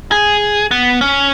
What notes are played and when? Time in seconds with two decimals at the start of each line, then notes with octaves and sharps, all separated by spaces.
0.12 G#4
0.71 B3
1.01 C#4